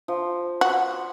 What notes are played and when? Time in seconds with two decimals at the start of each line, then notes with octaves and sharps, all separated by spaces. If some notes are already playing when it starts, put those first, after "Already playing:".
0.08 F3
0.61 F#4